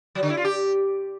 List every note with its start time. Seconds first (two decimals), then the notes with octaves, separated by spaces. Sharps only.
0.15 F#3
0.23 D3
0.30 E4
0.37 F4
0.45 G4